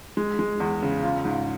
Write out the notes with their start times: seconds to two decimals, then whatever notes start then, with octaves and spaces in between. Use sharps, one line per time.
0.17 G#3
0.39 G#3
0.60 E2
0.82 C#3
1.03 F4
1.25 G#2